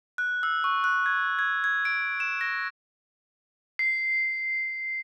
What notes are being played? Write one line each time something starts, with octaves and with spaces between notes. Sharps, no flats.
F#6
E6
C#6
F#6
G#6
G#6
G#6
D7
E7
A#6
C7